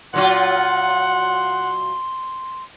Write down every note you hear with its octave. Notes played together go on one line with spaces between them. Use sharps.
A#2 F#3 F4 F#5 C6